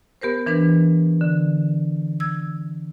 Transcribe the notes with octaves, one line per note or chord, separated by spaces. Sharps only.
B3 G4 A#4 C5
E3 D4 A#4 B4
D3
E6 G#6